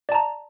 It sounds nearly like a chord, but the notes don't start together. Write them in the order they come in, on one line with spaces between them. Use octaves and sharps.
D5 A5 A#5